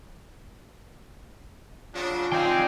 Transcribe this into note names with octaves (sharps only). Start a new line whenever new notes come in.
C#3 F#3 D4 F4
C4 D#4 D5 F5 G5 G#5